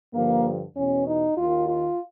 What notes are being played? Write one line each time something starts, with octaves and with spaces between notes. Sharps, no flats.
G2 D3 F3 A#3
E2 B2 C#4
D#4
D#2 D#3 F4
F4